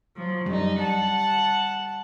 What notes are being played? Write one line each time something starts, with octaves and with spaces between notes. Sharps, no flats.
F3 F#3
F#2 G3 D#4
F#5 A5